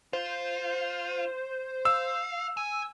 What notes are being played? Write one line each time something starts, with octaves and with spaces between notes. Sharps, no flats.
F4 C5
F5 E6
G#5 E6